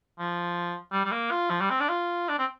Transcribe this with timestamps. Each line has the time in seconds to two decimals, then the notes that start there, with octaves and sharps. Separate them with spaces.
0.19 F3
0.92 G3
1.05 G3
1.11 A#3
1.31 F4
1.50 F3
1.61 G3
1.70 C4
1.80 D4
1.89 F4
2.29 D4
2.38 C4